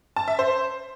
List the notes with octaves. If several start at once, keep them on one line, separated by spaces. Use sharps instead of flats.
A5
E5
C5